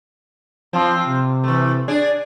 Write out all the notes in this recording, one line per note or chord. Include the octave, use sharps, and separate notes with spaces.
F3 C4 F4
C3
E3 A3
D4 G#4 D5